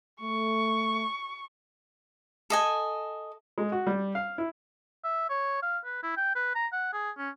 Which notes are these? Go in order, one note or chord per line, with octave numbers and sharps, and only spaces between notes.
A3 C#6
A4 D#5 G#5
G#3
F#4
G3
F5
E4
E5
C#5
F5
B4
E4
G5
B4
A#5
F#5
G#4
C#4